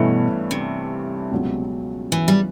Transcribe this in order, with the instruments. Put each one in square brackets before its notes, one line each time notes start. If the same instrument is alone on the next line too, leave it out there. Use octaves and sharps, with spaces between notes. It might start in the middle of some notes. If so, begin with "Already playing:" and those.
Already playing: [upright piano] G2 E3 A3 C#4 E4 [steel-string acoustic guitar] B2
[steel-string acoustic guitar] C3
[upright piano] C#2 B2 F#3
[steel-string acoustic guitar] E3
G3